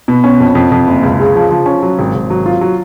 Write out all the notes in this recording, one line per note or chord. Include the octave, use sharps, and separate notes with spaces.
B2
C#4
F2
F2
F2
F#1
C#2
C#3
F3
F3
C#4
F#3
G#1
G#1
F#3
F4
F#3